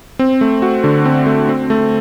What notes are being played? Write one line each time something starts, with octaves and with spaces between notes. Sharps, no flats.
C4
A3
F#4
D3
C4
A3
C4
A3